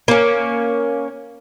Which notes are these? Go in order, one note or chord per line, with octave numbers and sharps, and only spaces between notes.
A#3 C#4